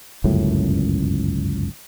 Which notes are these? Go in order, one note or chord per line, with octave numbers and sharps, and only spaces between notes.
G1 C#2 F#2 A2